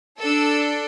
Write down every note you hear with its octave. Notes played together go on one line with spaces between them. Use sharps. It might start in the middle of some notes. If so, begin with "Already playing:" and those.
D4 A4 E6